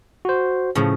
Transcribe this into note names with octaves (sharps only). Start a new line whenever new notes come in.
F#4 C5
A2 C#3 F3